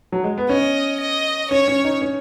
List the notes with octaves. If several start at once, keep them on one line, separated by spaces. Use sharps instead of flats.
F#3
G#3
B3
C#4 D#5
D#5
C#4 C#5
C#4
D#4
C#4